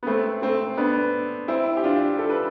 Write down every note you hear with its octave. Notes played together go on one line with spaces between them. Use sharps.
B3
A3 C4
A3 C4
B3 D4
C4 E4
G4
D4 F4
A4
B4